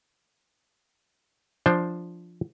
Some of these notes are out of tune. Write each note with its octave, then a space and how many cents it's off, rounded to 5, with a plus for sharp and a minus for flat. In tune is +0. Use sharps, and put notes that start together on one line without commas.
F3 +0 D4 +0 C5 +5